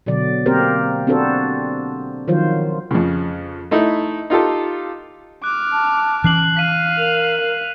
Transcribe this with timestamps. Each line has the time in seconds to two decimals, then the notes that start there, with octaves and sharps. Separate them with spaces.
0.06 B2 D3 F#3 D5
0.46 A#3 C4 G4 A#4 C5
1.07 C4 D4 F#4 A4 C5
2.28 D#3 F3 F#3 F4 C5
2.91 F2 C#3
3.71 A3 D#4 E4
4.30 D#4 F4 G4 A4
5.44 D6 F6 F#6
5.72 A5
6.24 E3 C#4 F#6 C7 F#7
6.57 F5 B6 D#7
6.98 A#4 F7
7.41 F5